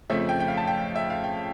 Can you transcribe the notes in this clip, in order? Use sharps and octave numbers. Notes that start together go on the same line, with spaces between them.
F2 C#3 F3 A3 E5
G5
G5
F5
A5
G5
E5
F5
G5